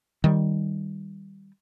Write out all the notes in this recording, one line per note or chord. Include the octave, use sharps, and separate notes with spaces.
D#3 G3